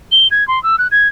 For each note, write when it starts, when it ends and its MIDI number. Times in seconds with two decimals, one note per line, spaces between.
0.12 0.28 103
0.31 0.46 92
0.48 0.62 84
0.63 0.76 88
0.78 0.88 90
0.91 1.08 92